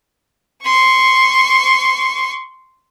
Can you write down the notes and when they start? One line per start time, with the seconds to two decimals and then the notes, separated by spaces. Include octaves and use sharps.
0.64 C6 C#6